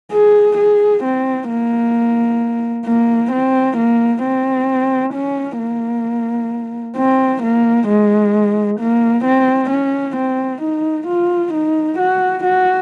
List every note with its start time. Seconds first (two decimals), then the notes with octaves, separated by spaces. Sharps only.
0.12 G#4
0.57 G#4
1.04 C4
1.49 A#3
2.86 A#3
3.32 C4
3.78 A#3
4.24 C4
5.14 C#4
5.59 A#3
6.97 C4
7.43 A#3
7.88 G#3
8.80 A#3
9.25 C4
9.70 C#4
10.17 C4
10.62 D#4
11.07 F4
11.53 D#4
11.99 F#4
12.44 F#4